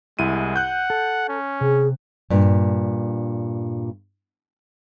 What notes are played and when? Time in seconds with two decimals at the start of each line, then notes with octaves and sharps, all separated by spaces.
0.19 C2 G#3 E4 D#7
0.56 F#5 F#6 G6
0.90 A4
1.29 C#4
1.61 C3 G#4
2.30 G2 A#2